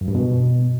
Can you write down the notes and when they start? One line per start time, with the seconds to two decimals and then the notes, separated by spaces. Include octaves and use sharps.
0.01 F#2
0.08 G2
0.15 B2